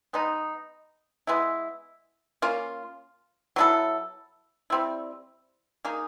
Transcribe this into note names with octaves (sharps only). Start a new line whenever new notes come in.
G#3 B3 D#4
G#3 B3 E4
A#3 C#4 F4
F#3 B3 E4 A4
G3 C4 E4
A#3 D#4 G#4